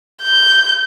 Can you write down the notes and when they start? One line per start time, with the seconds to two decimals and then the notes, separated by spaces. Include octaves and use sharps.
0.23 G6